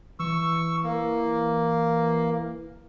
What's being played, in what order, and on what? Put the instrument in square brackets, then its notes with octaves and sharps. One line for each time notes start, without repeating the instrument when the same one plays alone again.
[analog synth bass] E3 [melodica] C#6 E6
[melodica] A#3